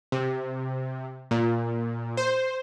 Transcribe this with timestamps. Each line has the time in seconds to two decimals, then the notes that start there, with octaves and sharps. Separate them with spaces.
0.12 C3
1.31 A#2
2.17 C5